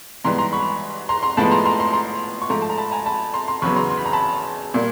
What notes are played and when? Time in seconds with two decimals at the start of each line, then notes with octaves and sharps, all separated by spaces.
0.24 G#2 E3 G3 B3 A#5 C6
0.38 A#5 C6
0.52 B5 C#6
1.09 A#5 C6
1.23 A#5 C6
1.37 A2 F3 G#3 B3 A5 B5
1.51 A#5 C6
1.65 A#5 C6
1.79 A#5 C6
1.93 A#5 C6
2.42 C#6
2.49 G#2 F3 A3 A#5 C6
2.62 A5
2.70 A#5
2.78 A5 B5
2.92 G#5 A#5
3.06 A5 B5
3.34 A#5 C6
3.48 A#5 C6
3.62 E2 C#3 F#3 B3 B5 C#6
3.76 A#5 C6
3.90 C6
3.97 B5
4.05 A#5
4.13 A5 B5
4.74 A#2 G3 A#3